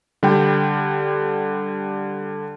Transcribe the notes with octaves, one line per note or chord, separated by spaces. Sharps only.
D3 G3 G5